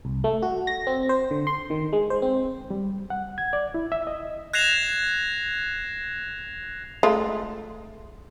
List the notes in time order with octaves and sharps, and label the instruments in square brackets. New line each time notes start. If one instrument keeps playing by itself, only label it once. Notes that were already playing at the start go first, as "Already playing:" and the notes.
[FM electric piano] C2
A3
F#4
A#6
C4
C5
D3
C6
D#3
G#3
C5
C4
[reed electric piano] G3
F#5
G#6
D5
E4
E5
D#5
[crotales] F#6 G#6 A#6 C7 E7 F7
[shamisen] G#3 A3 F4